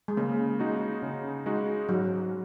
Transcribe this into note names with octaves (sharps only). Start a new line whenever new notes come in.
G#3
C#3 A#3
G#3 D#4 F#4
C#3
G#3 D#4 F#4
G#2 F#3